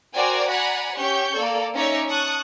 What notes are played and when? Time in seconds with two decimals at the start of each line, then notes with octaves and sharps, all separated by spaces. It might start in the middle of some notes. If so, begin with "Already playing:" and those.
0.15 F#4 A#4 C5 D5 G5 G#5
0.50 D5 F#5 G#5 A#5 B5
0.97 C#4 G4 C#6 G6
1.35 A#3 A4 D5
1.73 C#4 D#4 C#5 D5 E5
2.08 A5 C#6 D#6 F#6